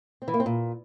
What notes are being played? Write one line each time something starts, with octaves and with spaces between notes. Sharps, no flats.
C4
E3
A#3
C4
A#2